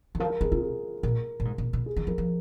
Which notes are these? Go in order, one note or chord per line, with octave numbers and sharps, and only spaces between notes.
D#3
F3 A#4
A#4
D#3 G#4
C3 F4
G#4
A#2 A#4
A#2
G#2
A#2
A#2
G#4
D#3
F3 A#4
F3